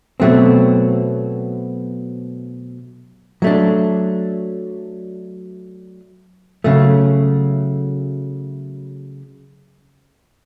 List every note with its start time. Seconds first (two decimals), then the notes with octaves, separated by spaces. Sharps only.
0.20 B2 F#3 A3 C4
3.42 F#3 A3 D4
6.64 C#3 F#3 A3